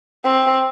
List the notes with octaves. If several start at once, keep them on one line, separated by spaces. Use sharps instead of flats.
C4